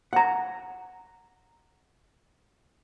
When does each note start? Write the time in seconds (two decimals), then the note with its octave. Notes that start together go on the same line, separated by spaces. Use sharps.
0.13 F#5 A#5